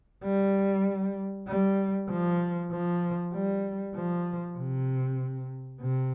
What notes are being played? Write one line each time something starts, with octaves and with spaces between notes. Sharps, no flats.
G3
G3
F3
F3
G3
F3
C3
C3